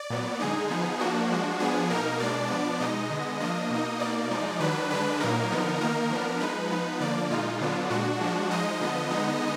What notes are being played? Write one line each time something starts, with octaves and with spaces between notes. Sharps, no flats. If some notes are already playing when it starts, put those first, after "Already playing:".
Already playing: D5
A#2 F#3 B3
D3 G#3 D#4 G#4
F3 B3 D#4
F3 A#3 D4 F#4
F3 G#3 D4
F3 B3 D4 G#4
B2 A#3 D#4 A#4
B2 G#3 D4 D5
F3 B3 D4
B2 G#3 D#4 D#5
D3 G#3 B3
F3 A#3 D4 D#5
B2 A#3 D#4
B2 A#3 D#4 D5
F3 G#3 D#4
D#3 F#3 D4 B4
D3 G#3 D4 B4
A#2 F#3 A#3 D#4 A#4
D3 F3 B3 D#4
D#3 A#3 D#4 A#4
F3 B3 D4
F3 G#3 D#4 B4
F3 B3 D#4
D3 F3 A#3 D5
A#2 G#3 D#4 F4
D3 F#3 B3 D4
A#2 G#3 D4 F#4
F3 G#3 D4
F3 G#3 D#4 D#5
D3 F3 B3
D3 G#3 B3 D#4